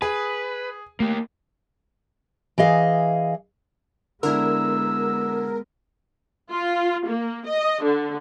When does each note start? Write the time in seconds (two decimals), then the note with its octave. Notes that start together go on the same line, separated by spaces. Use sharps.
0.02 G#4 B4
1.00 A3 A#3 G4
2.58 E3 G#4 D#5 F5
4.23 D3 G#3 B3 D4 E4 A#4 E6
6.50 F4
7.06 A#3
7.46 D#5
7.82 D3